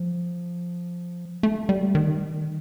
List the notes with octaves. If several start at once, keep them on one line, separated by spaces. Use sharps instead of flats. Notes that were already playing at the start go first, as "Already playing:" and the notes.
Already playing: F3
A3
G3
D#3